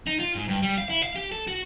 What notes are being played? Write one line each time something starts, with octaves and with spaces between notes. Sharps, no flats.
D#4
F4
G#2
G2
G3
F5
E4
F5
G4
A4
F#4